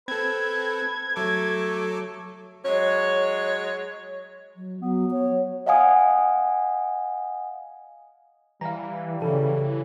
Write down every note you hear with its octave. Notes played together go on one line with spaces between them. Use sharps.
C4 A4 B4 G#6
F#3 A3 A4 D6
F#3 G#3 C#5
F#3
F#3 B3
C#5
D#5 F5 F#5 G#5 D#6
E3 G3 F5 A#5
C#3 E3 A4